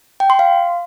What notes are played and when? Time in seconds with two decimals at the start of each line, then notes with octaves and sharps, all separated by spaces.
0.20 G5
0.30 C6
0.39 F5